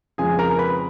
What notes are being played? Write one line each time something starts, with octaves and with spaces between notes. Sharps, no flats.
F2 C#3 F3 G#3 G#4 G#5
A#4 A#5
B4 B5